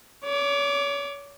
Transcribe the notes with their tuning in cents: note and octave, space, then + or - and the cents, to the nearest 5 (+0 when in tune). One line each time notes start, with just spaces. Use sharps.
C#5 +35 D6 +0